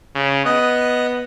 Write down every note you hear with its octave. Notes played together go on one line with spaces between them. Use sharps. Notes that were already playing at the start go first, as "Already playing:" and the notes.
C#3
B3 D#5 D#6 F#6